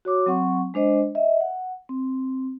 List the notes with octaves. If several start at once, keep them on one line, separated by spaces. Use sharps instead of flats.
F#4 C#5 D6
F#3 C4 F#5 C#6
G#3 D4 C5 D#5
D#5 E5
F#5
C4